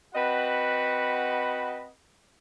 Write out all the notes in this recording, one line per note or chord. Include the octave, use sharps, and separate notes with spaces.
C4 F#4 B4 D#5 F#5 B5